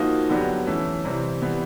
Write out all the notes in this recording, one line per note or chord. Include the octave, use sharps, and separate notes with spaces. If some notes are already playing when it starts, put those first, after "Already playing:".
Already playing: F3 A#3 D#4 F#4
D3 F#3 B3 D4 G4
E3 A3 C#4
C3 E3 G3 C4
E3 G3 B3